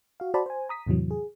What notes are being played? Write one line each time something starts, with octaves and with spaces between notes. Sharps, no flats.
F#4 F5
F#4 C5 D5 A5 B5
C5 G#5
A#5 D#6 B6
E2 A2 C3 E3 F#3
G#4